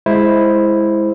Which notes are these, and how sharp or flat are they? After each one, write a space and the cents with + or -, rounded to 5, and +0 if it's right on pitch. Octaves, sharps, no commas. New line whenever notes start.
G#3 +0 E4 +0 C5 +0